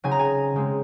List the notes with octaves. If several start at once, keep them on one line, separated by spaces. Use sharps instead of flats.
C#3 F#3 C4 D#4 G#5
A#5
G#5
C#3 G#3 C4